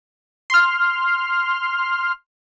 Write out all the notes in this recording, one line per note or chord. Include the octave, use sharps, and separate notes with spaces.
C6 F6